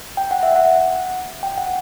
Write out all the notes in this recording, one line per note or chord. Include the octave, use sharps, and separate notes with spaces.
G5
F#5
E5
F#5
G5
F#5